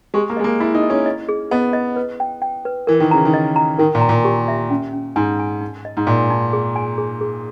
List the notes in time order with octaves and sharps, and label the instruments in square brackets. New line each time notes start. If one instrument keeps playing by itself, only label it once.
[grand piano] G#3 [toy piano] G4
[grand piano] A#3
[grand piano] G#3 [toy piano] D#5
[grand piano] A#3
[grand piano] E4 [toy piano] D#5
[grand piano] D#4
[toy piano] D#5
[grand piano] C#4
[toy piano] D#5
G#4
[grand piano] B3 [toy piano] D#5
[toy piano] D#5
B4
G5
G5
B4
[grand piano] E3 [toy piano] A#4
[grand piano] D#3
[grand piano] C#3 [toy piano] A#5
[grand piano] D#3
[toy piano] D#5
A#5
[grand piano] D#3 [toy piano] A#4
[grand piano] A#2
[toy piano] A#5
[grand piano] A#2
[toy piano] G4
E5
C#4
C#4
[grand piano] G#2 [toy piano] G#5
[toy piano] G#5
D#4
D#5
[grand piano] G#2
[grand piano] A#2 [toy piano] D#5
[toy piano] D#4
G#4
G#5
G#4
G#4